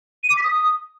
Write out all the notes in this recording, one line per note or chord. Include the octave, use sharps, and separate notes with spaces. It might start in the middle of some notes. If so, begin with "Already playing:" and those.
D#7
D6
B6
D#6